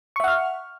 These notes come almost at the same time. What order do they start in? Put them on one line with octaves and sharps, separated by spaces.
C#6 E5 F#5 F6